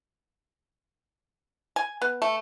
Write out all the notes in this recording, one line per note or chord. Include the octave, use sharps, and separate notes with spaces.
G#5
B3
A3